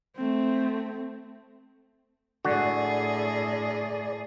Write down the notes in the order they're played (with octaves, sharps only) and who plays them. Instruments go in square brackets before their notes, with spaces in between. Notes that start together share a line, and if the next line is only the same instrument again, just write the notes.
[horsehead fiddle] A3 C4
[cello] A2 G#4 [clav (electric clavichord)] D3 F#4 [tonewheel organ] D5